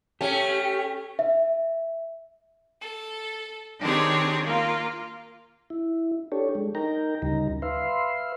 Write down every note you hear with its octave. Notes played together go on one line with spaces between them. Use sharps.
A3 C#4 G4
E5
A4
D#3 C4 D4 G4 G#4 C#5
A#3 F4
E4
D4 G4 A4 C#5
G#3
D#4 A#4 G5 A#5
D2 C#3 G3 D#4 A#5
B4 E5 F5 C6